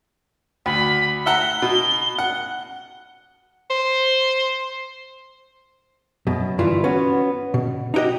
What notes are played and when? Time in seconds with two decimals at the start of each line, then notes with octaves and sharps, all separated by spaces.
0.66 D2 B5
1.26 E5 F#5 A#5 G7
1.62 B2
2.18 F#5
3.70 C5
6.27 F#2 B2
6.59 D2 G2 E3 E4 F4
6.84 B3 C#4 F#4 C#5
7.54 B2
7.94 D#4 E4 F#4 G4 D#5